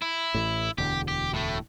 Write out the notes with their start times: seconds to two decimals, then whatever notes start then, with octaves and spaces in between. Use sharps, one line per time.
0.02 E4
0.34 A1 A2
0.78 E1 D2 D3 G4
1.08 G4
1.34 A2 A3